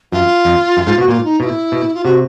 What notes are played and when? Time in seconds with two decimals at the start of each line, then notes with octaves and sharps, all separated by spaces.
0.12 F#2 F4
0.45 F2
0.77 F#2
0.87 G#2
0.98 B2 F#4
1.08 A#2 F4
1.25 D#4
1.40 B2 F4
1.45 E4
1.72 B2
1.94 F4
2.04 C3 F#4